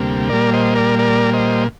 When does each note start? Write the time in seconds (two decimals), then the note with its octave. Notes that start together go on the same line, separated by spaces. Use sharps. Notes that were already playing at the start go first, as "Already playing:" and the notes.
Already playing: D2 C3 G3 A#3
0.29 A#2 G3 A#3 A#4 D5
0.53 C5 D#5
0.76 A#4 D5
0.99 A#4 D5
1.33 C5 D#5